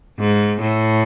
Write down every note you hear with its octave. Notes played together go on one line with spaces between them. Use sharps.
G#2
A2